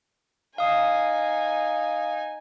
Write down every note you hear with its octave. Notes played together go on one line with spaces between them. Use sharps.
D#4 F5 G#5 D#6